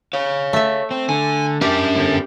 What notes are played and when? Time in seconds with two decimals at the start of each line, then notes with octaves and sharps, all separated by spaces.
0.13 C#5 F5
0.53 A3 E5
0.91 C4
1.09 D3 G#5
1.61 C#4 D4 G4 A#4
1.95 G2 D3